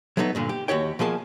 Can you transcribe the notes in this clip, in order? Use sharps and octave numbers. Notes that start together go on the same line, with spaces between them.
F#3 A3 B3 D4 D#4
G2 A#2 D3
G4
D#2 F3 F#4 G4 C#5 G5
B2 F3 A#3 G#4 A5